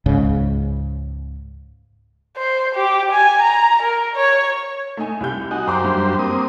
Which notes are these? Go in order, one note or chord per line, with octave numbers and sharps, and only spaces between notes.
C#2 G#2 C#3
C5
G4
G#5
A#5
A#4
C#5
A3 D#4 G#5
C2 G4 G6
D#4 F#4 G#5
F#2 G4 C5 A#5 D6
G2
A#3 C4 D#6